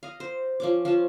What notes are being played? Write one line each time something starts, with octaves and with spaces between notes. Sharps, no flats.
D#5 F5
C5
F3 C#4 D6
F3 C#4 A5